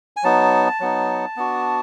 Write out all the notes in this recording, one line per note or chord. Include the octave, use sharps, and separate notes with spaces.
G#5
F#3 B3 D#4 A5
F#3 B3 D#4
B3 D4 F#4